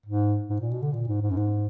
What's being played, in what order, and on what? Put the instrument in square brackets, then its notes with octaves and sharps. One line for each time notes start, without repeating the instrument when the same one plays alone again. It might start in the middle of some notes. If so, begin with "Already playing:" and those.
[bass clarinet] G#2
G#2
A#2
B2
D3
A#2
G#2
G#2
F#2
G#2